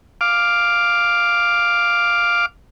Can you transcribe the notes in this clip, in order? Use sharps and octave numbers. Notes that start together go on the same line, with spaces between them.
F5 D6